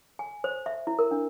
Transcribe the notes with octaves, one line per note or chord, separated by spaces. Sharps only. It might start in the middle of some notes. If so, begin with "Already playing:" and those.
G#5
C5
E5
E4
A#4
D4